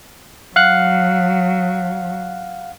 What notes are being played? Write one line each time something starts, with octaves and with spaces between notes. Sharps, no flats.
F#3 F5 F#5 F#6